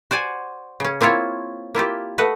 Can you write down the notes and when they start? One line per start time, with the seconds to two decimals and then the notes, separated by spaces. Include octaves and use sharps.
0.11 F#4 C5 D5 G#5
0.80 C#3 C#4
1.01 A#3 C4 E4 F4 C#5
1.75 A#3 E4 F4 G4
2.18 A3 B4 D#5 F#5